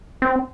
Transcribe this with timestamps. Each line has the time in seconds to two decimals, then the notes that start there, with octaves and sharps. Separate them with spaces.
0.22 C4